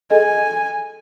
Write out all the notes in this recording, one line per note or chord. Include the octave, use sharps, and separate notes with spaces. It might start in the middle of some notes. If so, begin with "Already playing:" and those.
G#4 A4 D#5 G#5